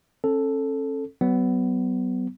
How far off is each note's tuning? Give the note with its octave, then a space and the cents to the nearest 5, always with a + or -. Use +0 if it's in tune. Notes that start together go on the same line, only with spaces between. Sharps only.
C#4 -40 A4 +0
F#3 +30 B3 +15